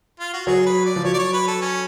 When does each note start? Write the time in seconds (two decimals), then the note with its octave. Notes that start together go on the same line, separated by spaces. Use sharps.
0.20 F4
0.33 F#4
0.47 F#3 G#4
0.66 B4
0.86 D5
0.96 F3
1.05 F#3 C#5
1.14 D5
1.19 C#5
1.33 B4
1.47 A4
1.62 C#4